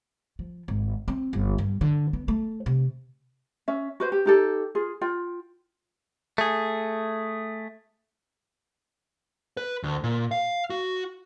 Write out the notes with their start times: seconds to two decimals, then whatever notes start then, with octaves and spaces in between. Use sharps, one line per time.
0.39 F3
0.68 G#1
1.08 C4
1.33 G1
1.58 G2
1.81 D3
2.13 B3
2.28 A3
2.66 C3
3.68 C#4 E5
4.00 F#4 B4 C5
4.12 G4
4.26 D#4 G4 A4
4.75 F4 G#4
5.01 F4 G5
6.38 A3 G#4
9.57 B4
9.83 D2
10.04 A#2
10.31 F5
10.70 F#4